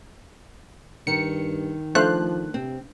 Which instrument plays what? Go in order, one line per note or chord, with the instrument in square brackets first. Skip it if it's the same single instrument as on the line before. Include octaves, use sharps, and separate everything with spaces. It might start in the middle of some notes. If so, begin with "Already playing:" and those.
[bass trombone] G2 [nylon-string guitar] D#3 [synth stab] C#7
[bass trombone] F3 [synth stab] A3 F#6 [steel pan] D4 C5 F5
[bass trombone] C3 [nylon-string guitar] C4